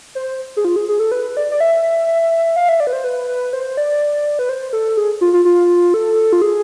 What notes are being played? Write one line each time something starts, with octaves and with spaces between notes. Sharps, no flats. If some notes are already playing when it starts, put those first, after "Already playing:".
C5
G#4
F4
G#4
G#4
A4
B4
D5
D5
E5
F5
E5
D5
B4
C5
B4
C5
D5
B4
C5
A4
G#4
F4
F4
F4
A4
F4
G#4